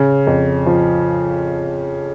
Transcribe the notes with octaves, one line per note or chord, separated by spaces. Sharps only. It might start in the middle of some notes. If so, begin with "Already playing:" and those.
Already playing: C#3
F2
F3